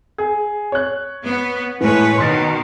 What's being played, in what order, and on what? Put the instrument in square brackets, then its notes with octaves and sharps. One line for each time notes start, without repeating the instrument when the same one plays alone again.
[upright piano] G#4
C#5 F#6
[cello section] B3
[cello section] A2 B4 C#5 [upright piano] E3 G#3
[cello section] B2 D#3 [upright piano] C6 A6